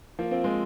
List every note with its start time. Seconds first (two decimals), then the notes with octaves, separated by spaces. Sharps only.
0.19 F3 A#3
0.31 C4 F4
0.44 G#3 C4